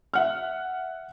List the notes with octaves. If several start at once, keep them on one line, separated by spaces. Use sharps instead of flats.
E5 F#5 F6